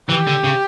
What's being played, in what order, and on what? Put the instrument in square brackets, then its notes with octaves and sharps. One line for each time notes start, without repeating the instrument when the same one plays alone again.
[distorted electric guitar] E3 [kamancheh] G4
[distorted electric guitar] D3
C#3